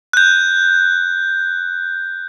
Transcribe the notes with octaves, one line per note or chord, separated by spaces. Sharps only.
F#6 G6